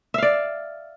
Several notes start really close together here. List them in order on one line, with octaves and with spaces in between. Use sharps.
E5 F5 D5